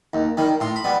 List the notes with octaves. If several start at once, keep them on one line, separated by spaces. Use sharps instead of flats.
D#2
D#3 G3
A2 C6
B5
G3 B3